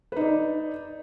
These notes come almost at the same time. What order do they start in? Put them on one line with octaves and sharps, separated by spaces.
B4 D#4 D5